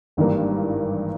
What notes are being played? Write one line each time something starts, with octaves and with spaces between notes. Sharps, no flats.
G#1 G2 E3 G3 A#3